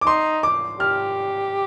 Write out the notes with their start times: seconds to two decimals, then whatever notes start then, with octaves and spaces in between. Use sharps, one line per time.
0.01 D6
0.06 D#4 C6
0.43 D6
0.79 G4 F6